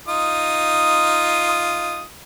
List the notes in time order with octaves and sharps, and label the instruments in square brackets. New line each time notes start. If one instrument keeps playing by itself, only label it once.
[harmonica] D#4 F4 D#6